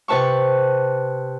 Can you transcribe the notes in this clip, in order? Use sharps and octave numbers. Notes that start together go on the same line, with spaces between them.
C3 B4 A5 C#6